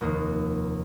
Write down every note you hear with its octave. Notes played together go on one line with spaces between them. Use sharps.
F1 D#2 D#3 A#3